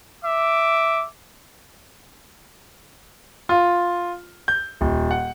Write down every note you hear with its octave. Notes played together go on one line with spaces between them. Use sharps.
E5 D6
F4
G6
D#1
F#5